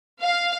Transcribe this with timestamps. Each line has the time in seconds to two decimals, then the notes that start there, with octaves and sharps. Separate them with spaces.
0.21 F5